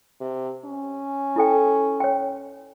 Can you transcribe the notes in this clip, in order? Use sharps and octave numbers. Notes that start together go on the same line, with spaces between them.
C3
C#4
E4 A4 G5
C#5 G5